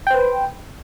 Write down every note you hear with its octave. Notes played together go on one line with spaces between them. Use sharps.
B4 C5 G5